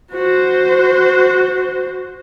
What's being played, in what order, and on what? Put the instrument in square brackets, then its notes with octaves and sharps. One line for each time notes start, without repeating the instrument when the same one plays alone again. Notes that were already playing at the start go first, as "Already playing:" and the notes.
[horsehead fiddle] F#4 C5